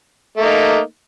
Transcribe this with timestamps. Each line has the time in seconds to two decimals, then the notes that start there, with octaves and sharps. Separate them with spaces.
0.37 A3
0.41 A#3
0.44 D#4